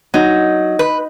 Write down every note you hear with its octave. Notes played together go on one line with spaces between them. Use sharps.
F#3 D#4
B4